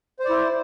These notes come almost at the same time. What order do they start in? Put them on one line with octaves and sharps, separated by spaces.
C5 D5 E4